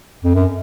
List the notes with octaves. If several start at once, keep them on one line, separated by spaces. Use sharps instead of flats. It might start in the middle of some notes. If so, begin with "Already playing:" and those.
F2
F#2